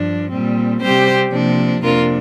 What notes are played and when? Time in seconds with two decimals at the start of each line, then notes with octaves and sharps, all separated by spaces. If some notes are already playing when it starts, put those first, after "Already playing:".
Already playing: G2 F3 D4
0.31 A#2 G3 C4
0.82 C3 G3 C4 G4 C5
1.32 C3 F3 A#3 D4
1.82 F2 C3 A#3 D4 F4 A#4